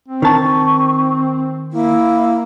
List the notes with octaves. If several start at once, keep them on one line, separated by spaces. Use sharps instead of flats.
C4
D#3 A5 C#6
A#3 E4